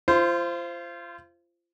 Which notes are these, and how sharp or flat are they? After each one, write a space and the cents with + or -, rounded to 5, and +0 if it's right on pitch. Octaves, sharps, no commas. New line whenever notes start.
F4 -30 C5 +0 C6 -30